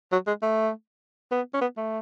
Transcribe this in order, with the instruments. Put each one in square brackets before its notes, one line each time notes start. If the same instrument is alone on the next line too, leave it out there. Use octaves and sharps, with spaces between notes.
[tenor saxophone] F#3
G#3
A3
B3
C#4
B3
A3